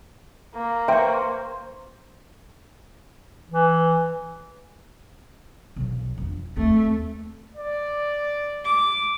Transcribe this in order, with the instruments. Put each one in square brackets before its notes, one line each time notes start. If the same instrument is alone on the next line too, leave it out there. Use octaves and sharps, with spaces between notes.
[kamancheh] A#3
[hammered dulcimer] C5 C#6 [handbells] E5 G5
[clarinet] E3
[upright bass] B1 F3
F2 D3
[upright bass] D#2 C4 [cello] A3
[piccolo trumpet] D5
[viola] D6